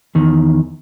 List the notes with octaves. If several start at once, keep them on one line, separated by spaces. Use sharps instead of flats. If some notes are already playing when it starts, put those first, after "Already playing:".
E2 D#3